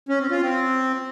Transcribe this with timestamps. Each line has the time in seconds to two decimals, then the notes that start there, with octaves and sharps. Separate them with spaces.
0.09 C#4
0.20 C4
0.31 F4
0.42 C4